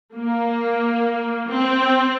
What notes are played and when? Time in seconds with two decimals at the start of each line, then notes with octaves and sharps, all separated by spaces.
0.14 A#3
1.49 C4